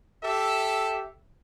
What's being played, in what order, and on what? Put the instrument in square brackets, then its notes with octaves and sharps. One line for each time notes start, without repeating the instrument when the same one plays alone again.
[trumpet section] G4 A4 E5